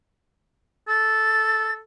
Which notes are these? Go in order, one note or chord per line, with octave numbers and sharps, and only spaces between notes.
A4 A6